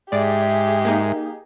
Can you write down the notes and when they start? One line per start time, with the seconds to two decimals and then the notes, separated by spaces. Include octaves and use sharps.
0.12 G#2 G4 G#4 D5 E5
0.85 A#3 D#4